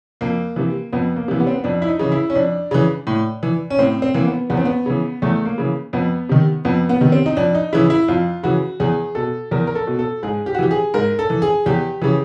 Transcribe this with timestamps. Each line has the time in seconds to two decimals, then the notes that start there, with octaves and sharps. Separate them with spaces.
0.21 F2 A#3
0.56 C3 E3
0.92 F2 B3
1.16 A#3
1.28 C3 E3
1.40 B3
1.47 C4
1.54 B3
1.64 F2 D4
1.82 E4
1.88 D#4
1.99 C#3 E3
2.12 E4
2.30 C#4
2.35 F2 D4
2.71 C#3 E3
3.07 A2
3.43 E3
3.70 C#4
3.79 A2 C4
4.02 C4
4.14 E3 A#3
4.27 B3
4.50 E2 B3
4.57 C4
4.65 B3
4.86 C#3 E3
5.22 E2 A3
5.45 A#3
5.58 C#3 E3
5.93 F2 B3
6.29 C3 D#3
6.65 F2 B3
6.89 B3
7.01 C3 D#3
7.12 C4
7.26 D#4
7.37 F2 D4
7.55 D#4
7.73 C#3 E3 E4
7.90 E4
8.08 F2 F4
8.43 C#3 E3 F#4
8.80 E2 G#4
9.15 B2 A4
9.51 E2 A#4
9.67 A#4
9.75 A4
9.87 B2
9.99 A4
10.23 G#2 G#4
10.46 G4
10.55 F#4
10.59 E3 G4
10.71 G#4
10.94 G#2 A#4
11.19 A4
11.30 E3
11.42 G#4
11.66 E2 G4
12.02 C#3 E3